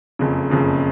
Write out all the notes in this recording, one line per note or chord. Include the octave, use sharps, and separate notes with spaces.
F#1 F2 C#3
F#1 F2 C#3